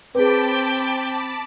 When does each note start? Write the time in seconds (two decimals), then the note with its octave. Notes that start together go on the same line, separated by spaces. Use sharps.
0.15 C4 G#4 B4 G5 A5 B5 D6